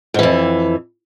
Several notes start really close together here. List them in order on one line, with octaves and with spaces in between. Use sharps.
G#2 E3 F2